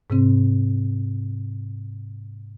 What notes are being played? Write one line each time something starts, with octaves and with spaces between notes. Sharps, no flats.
G#2 C3 C4